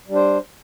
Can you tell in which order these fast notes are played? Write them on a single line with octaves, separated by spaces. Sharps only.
G3 D4 C5